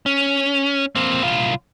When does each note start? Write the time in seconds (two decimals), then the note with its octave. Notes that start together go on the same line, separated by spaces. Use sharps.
0.06 C#4
0.95 A#3 C4
1.22 C2 F4